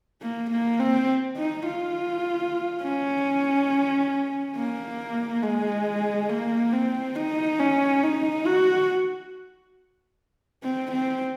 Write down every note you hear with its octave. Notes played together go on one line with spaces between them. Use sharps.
A#3
A#3
C4
D#4
F4
C#4
A#3
G#3
A#3
C4
D#4
C#4
D#4
F#4
C4
C4